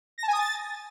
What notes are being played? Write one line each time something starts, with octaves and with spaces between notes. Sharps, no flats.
A#6
A5
G#5
D#6
A6